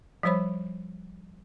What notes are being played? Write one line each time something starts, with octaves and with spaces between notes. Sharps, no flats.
F3 G3 C5 C#5 B5